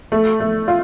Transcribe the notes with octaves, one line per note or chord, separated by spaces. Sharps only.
A3
A3
F4